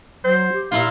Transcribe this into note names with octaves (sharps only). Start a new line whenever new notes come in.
F#3 C5
G4
A#2 E4 F4 F5